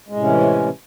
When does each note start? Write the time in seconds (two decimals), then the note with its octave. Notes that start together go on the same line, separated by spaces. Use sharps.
0.08 G#3
0.12 A2
0.16 C3
0.20 C#4
0.24 E3